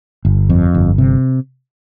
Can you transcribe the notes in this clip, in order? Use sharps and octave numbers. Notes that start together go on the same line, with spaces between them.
G1
F2
G1
C3